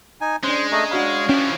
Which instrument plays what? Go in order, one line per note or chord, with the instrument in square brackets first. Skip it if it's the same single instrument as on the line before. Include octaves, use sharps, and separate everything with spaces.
[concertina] D#4 G#5
[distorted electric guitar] G#3 [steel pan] C#4 D4 [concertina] C5
[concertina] A3 D#5 [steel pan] G#4 A#5 C#6
[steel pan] D4 F#4 B5 [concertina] C#5 F5
[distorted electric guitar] E3 F3 [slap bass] C#4 [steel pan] G5